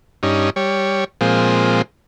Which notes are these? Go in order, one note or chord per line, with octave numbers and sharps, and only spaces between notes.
G2 C#4 D#4
G3 C#5
A#2 F3 G#3 C4